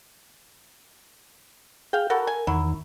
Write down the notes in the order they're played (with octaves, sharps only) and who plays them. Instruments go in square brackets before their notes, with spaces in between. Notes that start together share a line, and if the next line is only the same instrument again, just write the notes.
[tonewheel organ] G#4 [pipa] F5 G5
[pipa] E4 F#4 A4 [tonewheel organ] A#4
[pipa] G#5
[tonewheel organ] E2 D#3 [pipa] F#3 E4